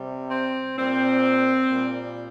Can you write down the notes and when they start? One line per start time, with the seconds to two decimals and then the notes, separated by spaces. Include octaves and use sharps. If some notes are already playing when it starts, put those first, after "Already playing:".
Already playing: C3 G3
0.31 C4
0.77 A#2 G3 C4
1.69 A#2 G3